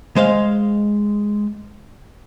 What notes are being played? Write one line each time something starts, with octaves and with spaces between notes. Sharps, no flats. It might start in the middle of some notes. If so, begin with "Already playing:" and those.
G#3 C5 F5